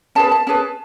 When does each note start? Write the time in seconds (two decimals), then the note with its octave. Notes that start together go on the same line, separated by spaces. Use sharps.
0.15 C#4 G#4 B4 A5
0.32 A5
0.47 C#4 G#4 B4 A5